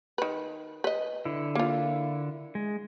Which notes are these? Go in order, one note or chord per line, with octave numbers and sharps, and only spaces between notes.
D#3 B4
B4 D#5
D3 E4
A#3 F4
G#3